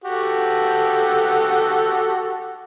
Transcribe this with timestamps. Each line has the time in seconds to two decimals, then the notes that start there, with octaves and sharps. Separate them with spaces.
0.04 F#4 G4 A4